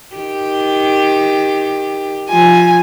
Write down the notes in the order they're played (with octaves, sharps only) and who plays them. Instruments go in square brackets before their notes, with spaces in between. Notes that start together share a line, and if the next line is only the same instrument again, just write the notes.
[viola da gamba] D#3 G4
[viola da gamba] F3 [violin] G#5